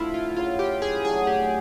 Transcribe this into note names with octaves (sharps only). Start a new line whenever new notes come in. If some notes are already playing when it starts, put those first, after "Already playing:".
Already playing: D3 F3 A3 E4 F4
F4
F#2 C#3 F#3 F4
G4
G#4
A2 F#3 A3 D4 G#4
G4